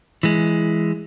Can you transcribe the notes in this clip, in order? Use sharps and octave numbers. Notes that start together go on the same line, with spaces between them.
E3 G#3